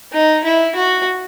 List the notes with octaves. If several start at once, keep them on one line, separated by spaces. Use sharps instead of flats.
D#4
E4
F#4